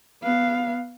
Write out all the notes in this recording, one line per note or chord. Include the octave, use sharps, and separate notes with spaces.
B3 F5